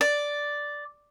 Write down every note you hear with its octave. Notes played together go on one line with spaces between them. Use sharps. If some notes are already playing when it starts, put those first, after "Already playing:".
D5